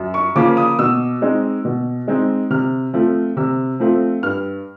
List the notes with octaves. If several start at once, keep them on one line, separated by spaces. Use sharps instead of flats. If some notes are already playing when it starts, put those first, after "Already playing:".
Already playing: F#2
C#6
C#3 F3 A#3 D6
D#6
B2 E6
G#3 C4 D#4
B2
G#3 C4 D#4
C3 F6
F3 A3 C4 F4
C3 E6
F3 A3 C4 F4
G2 F6